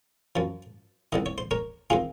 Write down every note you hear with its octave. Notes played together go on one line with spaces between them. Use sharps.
F#2 F3
C2 C3 D#3 D#5
C#5
C5
A#4 C#5
C3 D#3 F4 G#4